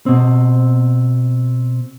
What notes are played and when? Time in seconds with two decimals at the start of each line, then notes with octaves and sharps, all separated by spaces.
0.06 B2 C4